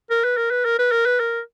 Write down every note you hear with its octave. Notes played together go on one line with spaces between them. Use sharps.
A#4
B4
A#4
B4
A#4
B4
A#4
B4
A#4